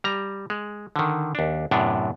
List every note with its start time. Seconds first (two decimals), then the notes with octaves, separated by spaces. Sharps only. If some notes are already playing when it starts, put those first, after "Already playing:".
0.04 G3 A#5
0.50 G#3
0.96 D3 D#3
1.35 D#2 D4
1.71 F#2 A2 C3 B3 D4